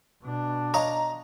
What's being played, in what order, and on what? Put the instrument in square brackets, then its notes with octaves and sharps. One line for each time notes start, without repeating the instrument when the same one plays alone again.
[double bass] B2 D4
[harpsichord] C#5 D#5 F5 [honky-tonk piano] A#5